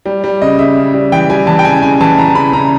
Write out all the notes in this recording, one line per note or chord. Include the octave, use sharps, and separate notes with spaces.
G3
G3
C#3 D#5
C#3 E5
C#3
G3
E3 G5
G3 G#5
E3 A5
G5
C#3 G#5
C#3 G#5
E3 A5
E3 A#5
C#3 B5
C#3 A#5